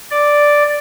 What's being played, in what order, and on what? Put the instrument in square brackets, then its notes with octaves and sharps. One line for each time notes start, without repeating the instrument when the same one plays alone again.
[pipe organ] D5